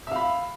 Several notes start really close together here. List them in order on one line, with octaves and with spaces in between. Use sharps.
E5 F5 B5